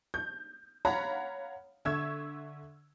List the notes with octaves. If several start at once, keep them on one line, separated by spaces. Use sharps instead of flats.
G6
C#5 F5 F#5 A#5 B5
D3 E5 C#6 E6 G#6